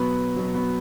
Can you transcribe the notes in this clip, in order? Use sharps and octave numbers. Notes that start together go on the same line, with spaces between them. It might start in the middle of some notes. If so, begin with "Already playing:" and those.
Already playing: B2 F#3 B3 B4
B2 F#3
B3 B4